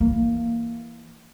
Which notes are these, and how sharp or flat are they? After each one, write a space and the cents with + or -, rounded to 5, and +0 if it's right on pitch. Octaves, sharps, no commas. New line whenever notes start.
E3 +0 A#3 +0